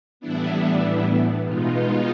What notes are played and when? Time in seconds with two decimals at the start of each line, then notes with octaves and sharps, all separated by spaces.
0.20 A2 E3 G3 B3 D4 E4
1.43 B2 G#3 B3 D#4 F4